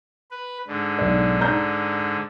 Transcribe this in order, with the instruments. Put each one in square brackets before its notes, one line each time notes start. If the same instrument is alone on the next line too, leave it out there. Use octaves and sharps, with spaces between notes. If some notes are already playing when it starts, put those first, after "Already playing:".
[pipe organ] B4
G#2 D3
[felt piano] B1 D5
D5 A#5 G6